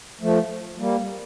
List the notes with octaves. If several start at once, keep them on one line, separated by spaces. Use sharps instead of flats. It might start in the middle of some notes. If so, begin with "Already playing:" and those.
F3 A3
G3 A#3